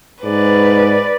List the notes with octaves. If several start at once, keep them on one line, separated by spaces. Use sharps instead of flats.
G#2 B4 D5